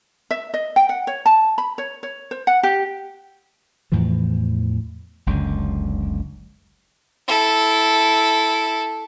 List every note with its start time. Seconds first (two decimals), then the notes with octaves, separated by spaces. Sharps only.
0.31 E5
0.54 D#5
0.76 G5
0.89 F#5
1.07 C#5
1.26 A5
1.58 B5
1.78 C#5
2.03 C#5
2.31 C5
2.47 F#5
2.63 G4
3.92 E2 A2 E3 F3
5.26 F#1 C#2 F#2 D3
7.28 E4 A4